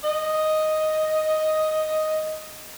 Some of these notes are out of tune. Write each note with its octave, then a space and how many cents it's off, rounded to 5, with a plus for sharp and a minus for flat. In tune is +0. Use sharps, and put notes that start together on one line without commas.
D#5 +0